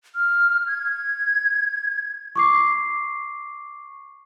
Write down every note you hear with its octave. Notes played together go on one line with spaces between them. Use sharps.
F6
G#6
C#6 D6 C7